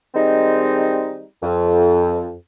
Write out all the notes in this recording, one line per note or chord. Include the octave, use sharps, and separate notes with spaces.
D#3 G3 G#3 C4 D#4
F2